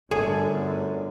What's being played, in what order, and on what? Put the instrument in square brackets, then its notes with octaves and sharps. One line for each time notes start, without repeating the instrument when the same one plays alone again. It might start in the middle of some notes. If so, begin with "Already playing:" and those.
[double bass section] G1 D3 [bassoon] F#2 [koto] G#4 [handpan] A4